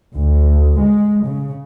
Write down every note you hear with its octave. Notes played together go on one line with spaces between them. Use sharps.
D2
G#3
C#3